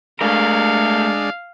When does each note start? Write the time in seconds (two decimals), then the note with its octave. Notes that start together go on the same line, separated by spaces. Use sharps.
0.21 G#3 A3 D4 A#4 F5